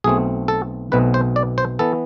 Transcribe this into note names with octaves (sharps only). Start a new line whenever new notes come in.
B1 B2 A3 C4 G#4
A4
B1 B2 A3 C4 B4
C5
D5
C5
E3 B3 A4